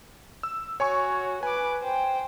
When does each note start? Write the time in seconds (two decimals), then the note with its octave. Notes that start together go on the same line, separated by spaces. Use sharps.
0.43 E6
0.80 F#4 C#5 G#5 C#6
1.43 B4 G#5 D6
1.82 C5 G5